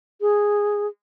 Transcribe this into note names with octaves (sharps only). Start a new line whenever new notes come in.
G#4